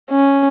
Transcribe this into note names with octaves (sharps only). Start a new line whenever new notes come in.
C#4